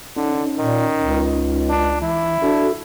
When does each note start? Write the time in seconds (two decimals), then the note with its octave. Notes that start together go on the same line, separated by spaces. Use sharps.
0.16 D3 C#4 D#4
0.58 A#2 D#3
0.98 C#2
1.69 D4
2.02 E3 E4
2.42 D4 F#4 A4